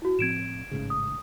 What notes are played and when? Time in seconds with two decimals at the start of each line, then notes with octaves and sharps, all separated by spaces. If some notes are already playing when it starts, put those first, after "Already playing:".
0.02 E4 F#4
0.19 A2 F3 C4 G#6 D7 E7
0.71 A1 G#2 C#3
0.90 D#6